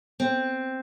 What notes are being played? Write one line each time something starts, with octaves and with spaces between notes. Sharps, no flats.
C4